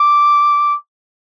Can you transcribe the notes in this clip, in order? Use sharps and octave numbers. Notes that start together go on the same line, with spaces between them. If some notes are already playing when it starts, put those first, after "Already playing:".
Already playing: D6